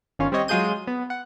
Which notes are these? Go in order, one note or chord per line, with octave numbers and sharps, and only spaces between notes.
G1 D#3 C#4 F4 C#5
G3 C4 G4 C#5 D#5
F#3 G#3 F4 G#4 G6 D#7
B3
F#5